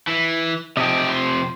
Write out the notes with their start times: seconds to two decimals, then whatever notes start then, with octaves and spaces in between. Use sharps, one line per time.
0.07 E3
0.77 C3 F3 D#5 G5
1.10 C6